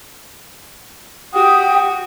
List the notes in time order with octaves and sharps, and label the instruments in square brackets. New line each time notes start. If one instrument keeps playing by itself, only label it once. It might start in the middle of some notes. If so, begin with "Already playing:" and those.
[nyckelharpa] F#4 [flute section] G4 G5 D#6